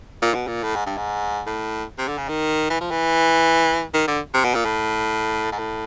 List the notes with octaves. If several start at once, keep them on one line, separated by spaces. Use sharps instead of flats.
A#2
B2
A#2
A2
G#2
G2
G#2
A2
C3
D3
C#3
D#3
E3
F3
E3
D#3
D3
C3
B2
A#2
A2
G#2
A2